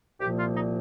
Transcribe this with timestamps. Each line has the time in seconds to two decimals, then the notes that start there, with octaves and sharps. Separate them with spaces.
0.20 C2 A#2 F3 A#3 G4
0.37 F4
0.54 D#4